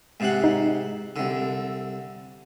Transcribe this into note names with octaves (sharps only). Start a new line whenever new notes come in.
G#2 C3 F#5
D#4
C2 D3